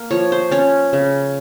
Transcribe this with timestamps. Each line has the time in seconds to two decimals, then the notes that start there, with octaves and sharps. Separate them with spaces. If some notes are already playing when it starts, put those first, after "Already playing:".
Already playing: A#3
0.11 F3 C#5
0.32 C5
0.51 C#4 C#5
0.93 C#3